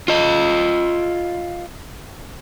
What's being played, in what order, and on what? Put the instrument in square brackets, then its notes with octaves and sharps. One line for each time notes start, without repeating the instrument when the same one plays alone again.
[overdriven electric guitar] F4 D#5